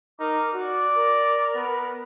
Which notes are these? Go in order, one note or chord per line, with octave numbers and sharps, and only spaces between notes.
D#4 A#4 D6 F6
F#4 D5
A#4
B3